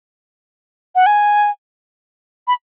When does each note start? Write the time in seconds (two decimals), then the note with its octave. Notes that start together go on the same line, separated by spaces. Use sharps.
0.95 F#5
1.06 G#5
2.48 B5